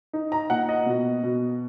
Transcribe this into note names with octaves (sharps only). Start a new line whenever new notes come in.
D#4
A#5
A#2 F#5
D#5
B2
B2